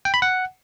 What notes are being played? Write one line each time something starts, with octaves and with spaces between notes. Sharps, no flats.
G5
B5
F#5